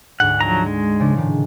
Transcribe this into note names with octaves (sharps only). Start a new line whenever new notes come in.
D2 G#2 F#5
F3 F#3 A#5
G#3
C#3 F3 D4
A2 D#3